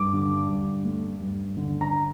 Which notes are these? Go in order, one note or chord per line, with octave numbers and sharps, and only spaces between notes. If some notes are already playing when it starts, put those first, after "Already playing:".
Already playing: G2 D6
D3
G2
A3
G2
D3
A#5